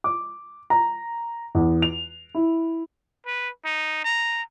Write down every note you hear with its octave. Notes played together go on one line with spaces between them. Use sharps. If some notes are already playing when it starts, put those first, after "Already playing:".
D6
A#5
E2
F7
E4
B4
D#4
A#5